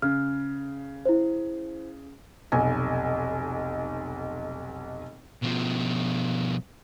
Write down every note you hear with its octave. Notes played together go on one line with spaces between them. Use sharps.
C#3 F6
E4 C5
F1 B1 G#5
B2 F3